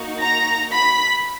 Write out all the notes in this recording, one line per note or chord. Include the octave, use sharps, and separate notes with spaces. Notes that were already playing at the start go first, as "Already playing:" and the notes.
Already playing: A#3 D#4 F#4
A#5 A#6
B5 B6